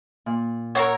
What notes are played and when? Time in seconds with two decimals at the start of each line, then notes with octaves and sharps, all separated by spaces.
0.26 A#2
0.75 A#4 C5 C#5 F#5 E6